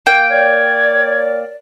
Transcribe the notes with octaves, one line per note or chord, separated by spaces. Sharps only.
A#3 G5
A#4 C#5 D5 G#6